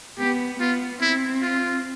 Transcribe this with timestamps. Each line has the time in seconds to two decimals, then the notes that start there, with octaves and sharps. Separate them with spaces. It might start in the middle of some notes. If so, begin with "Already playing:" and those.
0.18 B3 G4
0.60 B3 F4
1.01 C4 E4
1.42 F4